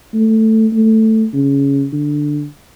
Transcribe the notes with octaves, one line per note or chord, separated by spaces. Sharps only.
A3
A3
C#3
D3